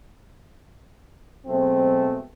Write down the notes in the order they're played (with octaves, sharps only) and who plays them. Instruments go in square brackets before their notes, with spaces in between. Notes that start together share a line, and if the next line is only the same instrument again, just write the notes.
[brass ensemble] B2 F#3 G#3 A3 C4